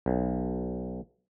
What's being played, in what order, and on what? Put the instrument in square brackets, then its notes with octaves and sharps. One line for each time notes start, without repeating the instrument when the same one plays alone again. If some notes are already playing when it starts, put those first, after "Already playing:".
[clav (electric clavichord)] B1